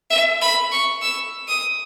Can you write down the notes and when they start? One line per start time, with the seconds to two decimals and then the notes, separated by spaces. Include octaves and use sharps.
0.10 E5
0.41 B5
0.72 C#6
1.02 E6
1.48 D#6